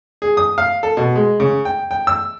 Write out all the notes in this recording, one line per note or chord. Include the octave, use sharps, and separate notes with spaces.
G#4
D#6
F5
A4
B2
G#3
C#3
G5
G5
E6